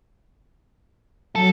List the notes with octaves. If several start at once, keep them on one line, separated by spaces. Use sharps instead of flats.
F#3 A4